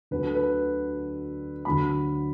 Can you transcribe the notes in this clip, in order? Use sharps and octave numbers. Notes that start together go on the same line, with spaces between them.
D2 D3 F#3 B4
A4
B4
D2 D3 F#3 B5